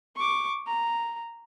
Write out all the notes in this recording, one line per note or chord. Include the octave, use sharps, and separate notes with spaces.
C#6 D6
A#5